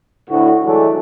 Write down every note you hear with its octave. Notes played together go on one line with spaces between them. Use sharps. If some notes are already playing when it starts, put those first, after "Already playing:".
D2 A2 F#4
E3 F#3 G#3 A3 D4 A4